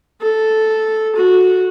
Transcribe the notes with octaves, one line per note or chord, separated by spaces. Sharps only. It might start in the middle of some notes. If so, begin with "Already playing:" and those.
A4
F#4